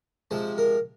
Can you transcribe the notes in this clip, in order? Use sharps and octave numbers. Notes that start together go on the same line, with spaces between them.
C3 F3 G#3 C5
A#4